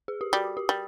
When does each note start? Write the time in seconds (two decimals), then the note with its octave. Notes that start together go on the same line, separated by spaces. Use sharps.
0.08 G#4
0.21 G4
0.33 G3 F#4
0.57 G4
0.69 G3